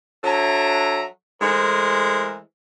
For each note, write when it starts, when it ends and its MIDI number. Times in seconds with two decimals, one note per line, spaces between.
0.24 1.03 54
0.24 1.03 62
0.24 1.03 69
0.24 1.03 76
0.24 1.03 80
0.24 1.03 82
1.41 2.38 52
1.41 2.38 56
1.41 2.38 57
1.41 2.38 70
1.41 2.38 72